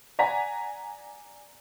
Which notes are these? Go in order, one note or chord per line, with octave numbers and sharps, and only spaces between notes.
D5 F#5 G#5 A#5 B6